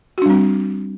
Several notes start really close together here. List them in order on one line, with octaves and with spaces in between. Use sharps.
F#4 D4 G3 C4